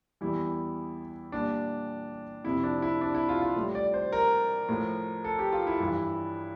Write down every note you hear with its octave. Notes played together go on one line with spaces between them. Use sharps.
E2 E3 G3 E4
A#2 G3 D4
F2 C3 F3 E4
D4
E4
D4
E4
F4
F4
A2 G3
D5
C5
A#4
A2 F3
A4
G4
F4
E4
G2 E3 G3